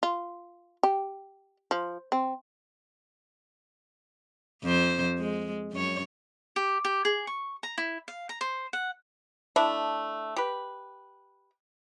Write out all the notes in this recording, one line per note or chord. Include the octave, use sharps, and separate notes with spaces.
F4
G4
F3
C4
F2 C5
G#3
F#2 C#5
G4
G4
G#4
C#6
A#5
E4
F5
A#5
C5
F#5
A3 D4 E4
G4 B4